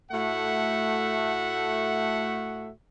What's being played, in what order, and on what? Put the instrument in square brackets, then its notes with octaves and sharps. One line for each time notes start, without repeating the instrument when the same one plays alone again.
[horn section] A2 A3 F#4 E5 F#5